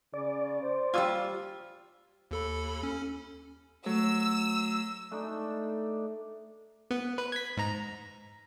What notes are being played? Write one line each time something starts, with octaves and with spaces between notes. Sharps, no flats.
C#3 D5
C5
G3 F4 G#5 E6
D#2 A4 B5
C#4
F#3 A3 E6
A3 D4 D#4
B3
B4
G#6 B6
G#2 A#5